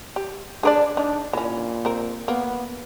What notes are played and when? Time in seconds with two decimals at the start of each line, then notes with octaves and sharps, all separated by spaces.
0.16 G4
0.63 D4 G#4 A#4 D5
0.97 D4 D#4
1.33 A#2 E3 C#4
1.85 C4 A#4
2.28 A#3 B3